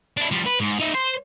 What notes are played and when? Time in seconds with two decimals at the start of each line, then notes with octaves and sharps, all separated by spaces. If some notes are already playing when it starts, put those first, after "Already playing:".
0.17 D4 E4
0.32 F3 G3
0.46 B4
0.60 G#2
0.80 D#4 E5
0.95 C5